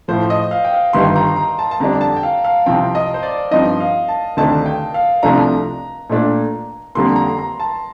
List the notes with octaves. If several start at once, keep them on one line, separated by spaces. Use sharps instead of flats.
A2 F3 A3 C5
D#5
F5
G5
F5
G1 G2 D#3 G3 C6
A#5
A#5
A5
A5
F2 D3 G3 D4 A#5
A5
G5
F5
F5
C2 C3 F3 C4 G5
D#5
C5
D5
G2 F3 C4 D#4 D#5
F5
A5
D2 C3 D#3 A3 D4 A5
G5
F5
C2 C3 F3 A3 D4 A#5
A#2 A3 D4
F2 D3 G3 A#3 C6
A#5
A#5
A5